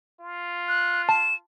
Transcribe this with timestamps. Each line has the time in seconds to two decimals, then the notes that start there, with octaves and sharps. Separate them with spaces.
0.20 F4
0.68 F#6
1.09 A5 E7